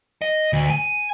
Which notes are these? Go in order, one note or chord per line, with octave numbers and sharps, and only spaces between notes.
D#5
D2
G#5